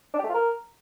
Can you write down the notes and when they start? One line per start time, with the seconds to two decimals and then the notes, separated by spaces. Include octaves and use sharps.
0.14 D4
0.19 G4
0.24 A3
0.29 F4
0.34 A#4